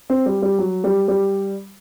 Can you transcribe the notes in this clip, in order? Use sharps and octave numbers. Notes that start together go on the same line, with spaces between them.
C4
G3
G3
F#3
G3
G3